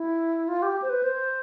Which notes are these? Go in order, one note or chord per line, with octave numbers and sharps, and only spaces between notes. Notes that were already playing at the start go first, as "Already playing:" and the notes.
Already playing: E4
F4
G4
C5
B4
C5